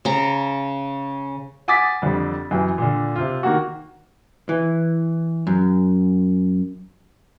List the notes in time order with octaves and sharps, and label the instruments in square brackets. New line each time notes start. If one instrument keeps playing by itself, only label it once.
[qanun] C#3 A#5
[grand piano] F#5 G#5 D6 D#6 A6 B6
F2 D3 G3
F#2 E3 G5
A#2 D3
C3 F4
D#3 A#3 F#4
[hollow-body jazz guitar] E3
F#2